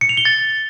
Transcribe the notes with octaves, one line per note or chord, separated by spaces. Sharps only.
C#7
F7
G7
A6